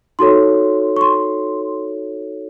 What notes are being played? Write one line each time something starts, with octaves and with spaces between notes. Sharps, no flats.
D#4 F#4 A4 C#5 C6
C#6
C6